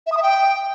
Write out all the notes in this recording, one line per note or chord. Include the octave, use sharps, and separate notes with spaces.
E5
D#6
E5
G5